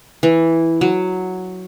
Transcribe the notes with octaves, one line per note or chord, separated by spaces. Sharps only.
E3
F#3